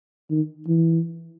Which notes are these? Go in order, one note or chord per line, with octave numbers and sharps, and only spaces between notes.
D#3
E3